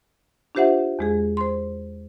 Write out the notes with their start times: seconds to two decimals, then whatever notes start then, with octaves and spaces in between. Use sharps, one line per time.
0.55 D4 F4 G4 C5 E5 F#5
0.99 E2 G#3 G#4
1.37 C5 C6